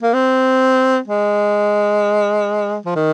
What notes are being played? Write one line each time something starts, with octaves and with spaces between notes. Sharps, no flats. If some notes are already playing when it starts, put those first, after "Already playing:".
A#3
C4
G#3
F3
D#3